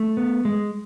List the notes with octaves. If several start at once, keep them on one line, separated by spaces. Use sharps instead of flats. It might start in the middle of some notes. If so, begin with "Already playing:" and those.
Already playing: A3
B3
G#3